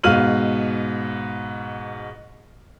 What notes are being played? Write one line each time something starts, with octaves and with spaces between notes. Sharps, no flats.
G#2 B2 F5 F6 D#7 F#7